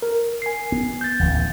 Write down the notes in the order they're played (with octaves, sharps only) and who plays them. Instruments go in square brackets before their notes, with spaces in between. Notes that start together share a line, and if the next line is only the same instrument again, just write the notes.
[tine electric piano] A#4
G#5 C7
[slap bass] B3
[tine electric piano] G6 A6
[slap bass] D1 A1 D2